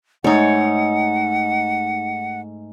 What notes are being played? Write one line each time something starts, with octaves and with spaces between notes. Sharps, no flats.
G#2 A3 D#4 C#5 F#5